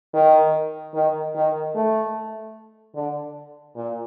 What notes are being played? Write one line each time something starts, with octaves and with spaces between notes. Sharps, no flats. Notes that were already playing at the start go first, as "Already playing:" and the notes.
D#3
D#3
D#3
A3
D3
A#2